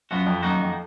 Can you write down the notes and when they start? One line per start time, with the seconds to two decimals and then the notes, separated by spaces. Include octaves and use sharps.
0.11 F#2 F3 B3 F#4
0.26 F2
0.43 F#2 D#3 A#3 D#4 F#4
0.53 F#2
0.59 F2